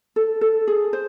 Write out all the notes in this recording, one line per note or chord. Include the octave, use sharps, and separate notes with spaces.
A4
A4
G#4
C5